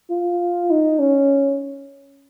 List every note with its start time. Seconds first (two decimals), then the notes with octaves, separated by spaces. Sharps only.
0.10 F4
0.71 D#4
0.99 C#4